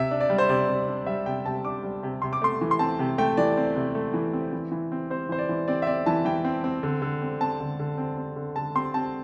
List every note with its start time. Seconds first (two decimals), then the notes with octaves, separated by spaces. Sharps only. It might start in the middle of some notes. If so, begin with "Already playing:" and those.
Already playing: C3 E5
0.11 D4
0.21 D5
0.30 G3
0.38 C5
0.49 C3 D5
0.68 C3
0.87 D4
1.06 G3 E5
1.26 C3 G5
1.46 C3 A5
1.65 D4 D6
1.83 G3
2.03 C3
2.22 C3 C6
2.33 D6
2.42 A3 C6
2.61 E3
2.71 C6
2.79 C4 A5
2.99 C3
3.18 A3 G5
3.37 E3 D5
3.57 C4
3.75 C3
3.95 A3
4.14 E3
4.33 C4
4.53 E3
4.72 E3
4.92 C4
5.10 C4 C5
5.29 E3 C5
5.39 D5
5.49 E3
5.68 C4 D5
5.82 E5
5.87 C4 D5
6.06 E3 A5
6.25 E3 G5
6.44 C4
6.64 C4
6.83 D3
7.02 D3
7.22 C4
7.41 C4 A5
7.60 D3
7.79 D3
7.98 C4
8.17 C4
8.36 D3
8.56 D3 A5
8.75 C4 C6
8.94 C4 A5